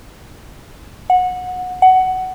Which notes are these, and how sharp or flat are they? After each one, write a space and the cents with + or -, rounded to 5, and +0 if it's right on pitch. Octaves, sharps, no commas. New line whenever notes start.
F#5 -20
F#5 +15